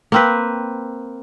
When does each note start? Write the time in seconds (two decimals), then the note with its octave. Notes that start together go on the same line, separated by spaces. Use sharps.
0.12 A#3 C4 B4